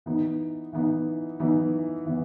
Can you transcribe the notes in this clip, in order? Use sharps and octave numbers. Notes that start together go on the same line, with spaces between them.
E3 B3 D#4
E3 B3 D#4
E3 B3 D#4
E3 B3